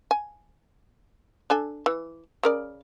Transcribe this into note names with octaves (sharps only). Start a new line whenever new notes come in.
G#5
D4 A4 G#5
E3
C#3 A#4 D5